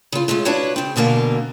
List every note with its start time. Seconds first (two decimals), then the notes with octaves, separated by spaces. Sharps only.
0.12 C#3 F4
0.28 G#3 A3 C#4 F4
0.45 D4 E4 F#4 B4 C#5 F5
0.76 C#3 C4
0.96 D2 B2 D3 A#3 F5